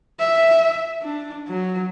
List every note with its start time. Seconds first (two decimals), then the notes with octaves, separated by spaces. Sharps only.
0.19 E5
1.02 D4
1.48 F#3